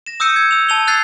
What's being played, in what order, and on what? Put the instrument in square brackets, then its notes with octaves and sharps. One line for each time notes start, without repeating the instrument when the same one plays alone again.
[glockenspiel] A#6 E7
D#6 E6 G6 C#7 D#7
G#6
E6 F7
A5 F7 G7
E6 F#6 G#6 A6 C7